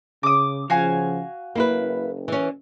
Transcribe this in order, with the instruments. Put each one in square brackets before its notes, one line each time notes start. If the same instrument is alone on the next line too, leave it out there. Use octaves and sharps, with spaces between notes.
[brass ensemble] C#3 [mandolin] D6 D#6
[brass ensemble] C#3 F3 [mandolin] F#4 F5 G#5
[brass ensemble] F#1 [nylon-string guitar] A#3 E4 B4
[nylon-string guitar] E3 C#4